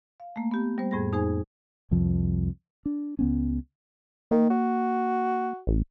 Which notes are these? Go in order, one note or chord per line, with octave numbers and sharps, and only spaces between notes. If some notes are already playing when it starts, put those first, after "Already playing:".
F5
A3 A#3
B3 G4
G3 B3 C5
F2 A2 G#4 B5 A#6
F2 D#4 G#4 C5 G#5
C2 F2 F3
D4
C#2 B3 C#4
D#3 A#3
F#4
A1